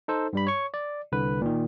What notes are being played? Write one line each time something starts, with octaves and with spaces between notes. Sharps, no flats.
D#4 A4 C5
G2 G3 B5
C#5 C#6
D5
C2 D3 B4
A#2 D#3